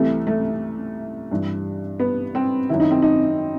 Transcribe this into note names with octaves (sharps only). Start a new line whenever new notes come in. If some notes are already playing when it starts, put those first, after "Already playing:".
Already playing: C2 C3 E3 A3
A3
G2 E3
B3
C4
F#2 D#3 E4
D#4
C4
D#4